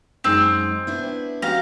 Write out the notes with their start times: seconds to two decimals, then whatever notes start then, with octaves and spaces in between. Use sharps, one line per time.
0.24 F#2 G#3 C4 D#4
0.87 B3 D4 E4
1.42 C#4 F#4 G4 F5 A#5